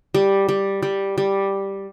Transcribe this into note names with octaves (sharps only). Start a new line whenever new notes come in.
G3
G3
G3
G3